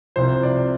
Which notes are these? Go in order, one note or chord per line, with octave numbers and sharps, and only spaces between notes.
C2 C3 F3 C5
D5